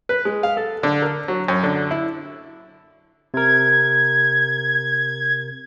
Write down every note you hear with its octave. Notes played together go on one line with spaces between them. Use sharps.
B4
G#3
F5
A4
D3
A#4
F#3
F#2
D3
E4
C3 A#4 G#6